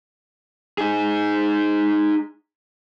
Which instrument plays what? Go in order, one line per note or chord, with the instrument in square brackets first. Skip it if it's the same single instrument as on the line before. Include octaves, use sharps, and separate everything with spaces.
[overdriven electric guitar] D#4 G#4